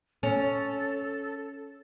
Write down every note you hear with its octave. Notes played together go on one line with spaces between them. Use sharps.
C#4 A4